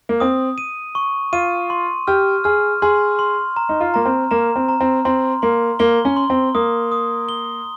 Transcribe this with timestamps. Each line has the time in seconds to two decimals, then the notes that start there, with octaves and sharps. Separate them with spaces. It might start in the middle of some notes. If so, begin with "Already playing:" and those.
0.09 A#3
0.20 C4 D#6
0.58 D#7
0.95 C#6
1.33 F4 D#7
1.70 C6
2.07 G4 F6
2.44 G#4 F6
2.82 G#4 C6
3.19 C6
3.57 A#5
3.69 D#4
3.81 F4
3.94 A#3 A#5
4.05 C4
4.31 A#3 A#5
4.56 C4
4.69 A#5
4.81 C4
5.05 C4 C6
5.42 A#3 C6
5.79 A#3 G7
6.05 C#4
6.17 C6
6.30 C4
6.55 A#3 D#6
6.92 D#6
7.29 G7